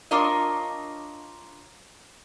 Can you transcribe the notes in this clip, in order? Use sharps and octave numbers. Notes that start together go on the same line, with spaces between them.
D4 F4 A#4 C#5 D#5